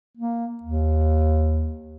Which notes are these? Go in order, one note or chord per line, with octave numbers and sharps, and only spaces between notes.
A#3
D#2